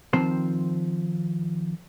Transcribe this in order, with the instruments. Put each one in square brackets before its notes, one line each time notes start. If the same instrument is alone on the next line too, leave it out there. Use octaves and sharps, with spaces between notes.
[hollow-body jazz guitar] D#3 F3 C4 C5